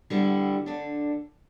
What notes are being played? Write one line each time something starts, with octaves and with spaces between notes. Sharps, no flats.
D3 G3 B3 E4
D3 A3 D4